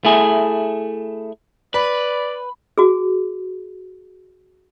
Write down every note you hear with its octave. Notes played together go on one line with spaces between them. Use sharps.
A3 E4 G#4
B4 D5 B5
F#4 G#4